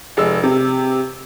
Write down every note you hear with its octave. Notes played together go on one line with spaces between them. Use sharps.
F1 G#3 E6
C3